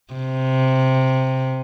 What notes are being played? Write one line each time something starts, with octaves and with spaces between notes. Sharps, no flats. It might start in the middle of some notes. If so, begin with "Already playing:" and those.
C3